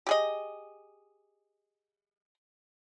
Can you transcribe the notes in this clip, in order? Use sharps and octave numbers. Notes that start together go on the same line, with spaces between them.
G4 G#4 D#5